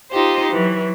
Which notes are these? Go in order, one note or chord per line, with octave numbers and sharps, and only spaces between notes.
D#4 F4 G4 C5
E3 F#3